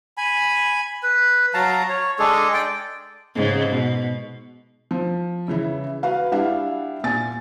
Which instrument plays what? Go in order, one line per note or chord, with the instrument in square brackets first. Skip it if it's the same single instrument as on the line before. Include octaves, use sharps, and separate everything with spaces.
[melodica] G#5 B5
B4
F#3 F5 A5 A#5
C#5
G#3 D4 G#4 A4
D5 G5
[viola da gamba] G#2 C#3
B2
[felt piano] F3
C#3 E3 E4
F#4 B4 F5
G3 D4 E4 F5 F#5
A#2 G#5 A6